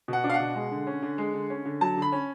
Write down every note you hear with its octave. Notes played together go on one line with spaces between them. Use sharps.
B2 F#5
D4
F5
F#5
B2
G#3
D3
C#4
D3
G#3
D3
C#4
D3
F#3 A5
D3
B5
C#4